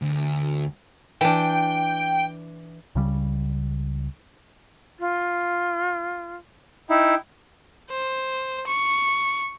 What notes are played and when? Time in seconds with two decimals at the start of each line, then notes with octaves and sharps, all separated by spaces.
0.02 D2
1.21 E3 D4 G5
2.95 C#2 C#3 G3
4.99 F4
6.90 D#4 E4 G5
7.90 C5
8.67 C#6